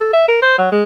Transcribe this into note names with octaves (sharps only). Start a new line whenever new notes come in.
A4
E5
A#4
C5
F#3
G#3